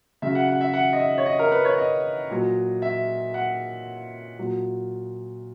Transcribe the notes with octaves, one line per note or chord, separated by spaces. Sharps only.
C#3 F#3 E5
F#5
F#5
E5
F#5
D#5
E5
C#5
D#5
A#4
B4
C#5
D#5
A#2 F#3
E5
F#5
A#2 F#3